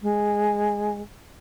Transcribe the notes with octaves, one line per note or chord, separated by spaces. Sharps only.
G#3